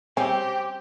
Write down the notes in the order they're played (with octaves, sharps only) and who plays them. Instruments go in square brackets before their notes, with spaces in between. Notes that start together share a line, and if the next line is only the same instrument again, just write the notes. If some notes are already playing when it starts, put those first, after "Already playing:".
[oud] C4 [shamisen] C#4 [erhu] G4